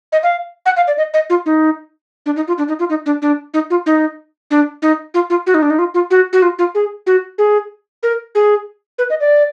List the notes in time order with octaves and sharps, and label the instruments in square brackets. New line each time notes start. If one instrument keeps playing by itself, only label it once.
[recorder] D#5
F5
F#5
F5
D5
D#5
D#5
F4
D#4
D4
D#4
F4
D4
D#4
F4
D#4
D4
D4
D#4
F4
D#4
D4
D#4
F4
F4
F#4
D#4
D4
D#4
F4
F4
F#4
F#4
F4
F4
G#4
F#4
G#4
A#4
G#4
B4
D#5
D5